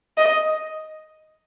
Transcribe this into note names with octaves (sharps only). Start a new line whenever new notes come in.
D#5